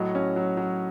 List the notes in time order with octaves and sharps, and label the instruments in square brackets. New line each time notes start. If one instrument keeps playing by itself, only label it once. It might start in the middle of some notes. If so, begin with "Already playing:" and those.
Already playing: [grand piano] A2 F#3 D#5
C#4
F#3
F#3